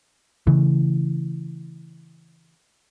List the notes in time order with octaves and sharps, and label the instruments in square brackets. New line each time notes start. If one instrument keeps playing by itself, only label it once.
[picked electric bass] C#3 E3 A3